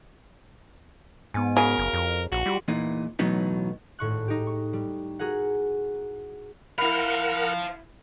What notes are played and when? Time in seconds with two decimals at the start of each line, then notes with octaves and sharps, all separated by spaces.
1.34 G#2 B3 G#5
1.57 C#3 F#4 A#4 F5
1.78 F#1
1.93 F2
2.32 A#1 F#4
2.46 G3 F4 G4
2.68 E2 A#2 E3 D#4
3.19 B1 A2 E3 F#3 B3 D#4
3.99 G#1 A2 C#6 F#6
4.28 D#4 G4
4.47 C#6
4.73 G3
5.19 F#4 G#4 A#4 F#5
6.78 E4 A#4 C5 F5 F#5 B5